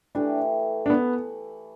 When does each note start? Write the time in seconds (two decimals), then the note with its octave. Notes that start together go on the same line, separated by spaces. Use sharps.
0.15 E3 A3 D4 G4
0.86 D4
0.90 B3